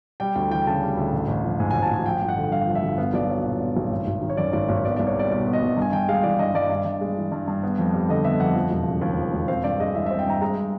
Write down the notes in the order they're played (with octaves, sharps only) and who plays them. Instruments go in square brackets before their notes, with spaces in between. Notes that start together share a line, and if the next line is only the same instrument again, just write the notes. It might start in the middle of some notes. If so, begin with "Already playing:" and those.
[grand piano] G3 G5
D2 G5
E3 G5
C#3 A5
G3
D2
A1
A1
F3
G#2 G#5
G#5
A1
A5
A1 G#5
F3 G5
G1
F#5
D3
G2 F5
F3
E5
G1
B3 F5
B1 D5
F#3
A#2
B3
B1
G#1
G#1
D#3
C#5
F#2 D5
G#1 D5
G#1 C#5
B3 D5
D5
C2
C#5
G3 D5
B2 D5
B3
D#5
C2
G2 G#5
G2 G5
G#3 F5
E3 D5
G2 D#5
G2 D5
G2
G2
G#3
E3
G2
G2
B3
F2
G3
D3 D#5
B3 E5
F2 F#5
F3
E1
C#3
D#2
F3
E1
C4 F5
G2 D5
G#3 D#5
E3 E5
E5
C4
G5
G2 A#5
G#3 A#5